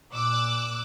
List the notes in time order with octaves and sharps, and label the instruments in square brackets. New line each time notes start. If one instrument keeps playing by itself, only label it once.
[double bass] A#2 [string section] D6 E6 F#6